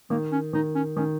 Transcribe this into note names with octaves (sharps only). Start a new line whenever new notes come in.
D#3 A#3
C#4
D#3 D#4
C#4
D#3 C#4